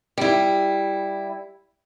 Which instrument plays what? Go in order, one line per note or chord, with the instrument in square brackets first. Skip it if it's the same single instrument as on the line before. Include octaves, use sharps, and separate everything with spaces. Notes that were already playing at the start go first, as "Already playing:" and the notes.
[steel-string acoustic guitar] G3 E4